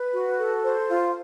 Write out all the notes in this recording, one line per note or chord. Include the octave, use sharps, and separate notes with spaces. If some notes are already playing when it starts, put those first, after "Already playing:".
Already playing: B4
F#4
A4
C5
F4